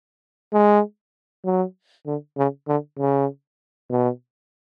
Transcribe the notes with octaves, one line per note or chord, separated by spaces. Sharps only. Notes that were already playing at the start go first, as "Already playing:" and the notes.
G#3
F#3
D3
C#3
D3
C#3
B2